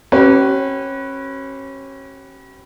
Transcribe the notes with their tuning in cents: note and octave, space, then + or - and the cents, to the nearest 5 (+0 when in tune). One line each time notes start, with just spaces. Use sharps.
C#4 -30 G4 -45 B4 +0